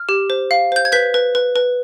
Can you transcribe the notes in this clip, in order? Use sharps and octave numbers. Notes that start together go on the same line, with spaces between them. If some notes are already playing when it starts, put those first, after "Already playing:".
Already playing: F6
G4
C5
F5
C5 G6
G#6
B4 G6 B6
B4
B4
B4